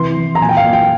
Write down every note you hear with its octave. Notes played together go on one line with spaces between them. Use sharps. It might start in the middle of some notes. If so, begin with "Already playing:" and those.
Already playing: C3 E3 C6
E3
A#5
A#2 G#5
G5
F5
A#2
G5